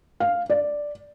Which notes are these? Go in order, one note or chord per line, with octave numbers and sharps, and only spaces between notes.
F5
D5